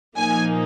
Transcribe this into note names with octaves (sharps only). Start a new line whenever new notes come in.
A#2 F3 A#3 D#4 G#5